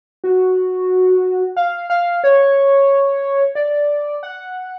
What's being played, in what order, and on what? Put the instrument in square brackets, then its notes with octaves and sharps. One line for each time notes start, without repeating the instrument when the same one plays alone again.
[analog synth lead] F#4
F5
F5
C#5
D5
F#5